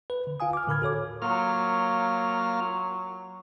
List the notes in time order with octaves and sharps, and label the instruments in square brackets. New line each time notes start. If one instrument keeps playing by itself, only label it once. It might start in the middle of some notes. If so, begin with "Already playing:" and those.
[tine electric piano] B4
D3
F4 F5 G#5 D#6
D6 F6
A2 D3 A#4 B5 F6 G#6
F#4 A4 C#5 D6
[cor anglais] F#3 [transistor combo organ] A#3 F4 F6